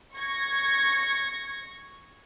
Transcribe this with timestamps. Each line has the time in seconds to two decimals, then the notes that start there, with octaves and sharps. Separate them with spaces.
0.16 C#6 G#6 A#6